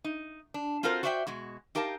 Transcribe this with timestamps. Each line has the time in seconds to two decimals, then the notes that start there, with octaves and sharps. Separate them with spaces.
0.04 D#4
0.54 D4
0.83 C4 F4 F#4 A4 A#4 C5
1.03 F#4 C5 D5 E5 F#5 G5
1.27 B2 G#3 F#4
1.75 D#4 G4 A#4 F5 A5